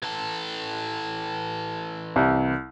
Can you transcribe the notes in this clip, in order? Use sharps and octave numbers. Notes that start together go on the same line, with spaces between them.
E3 A4
C2